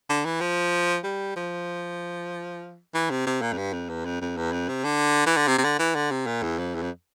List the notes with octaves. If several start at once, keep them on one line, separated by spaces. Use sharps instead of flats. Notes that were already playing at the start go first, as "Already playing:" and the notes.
D3
E3
F3
G3
F3
E3
C3
C3
A#2
F2
G2
F2
E2
F2
F2
E2
F2
C3
D3
E3
D3
C3
C3
D3
E3
D3
C3
A#2
E2
F2
E2
F2